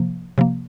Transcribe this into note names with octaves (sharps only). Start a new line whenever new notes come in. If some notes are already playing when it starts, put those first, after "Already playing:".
Already playing: C3 F3 A#3
C3 F3 A#3